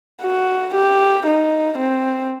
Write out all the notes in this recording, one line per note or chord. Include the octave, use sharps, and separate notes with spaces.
F#4
G4
D#4
C4